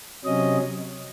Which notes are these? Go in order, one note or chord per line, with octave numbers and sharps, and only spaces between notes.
C3 F#3 C#4 D#5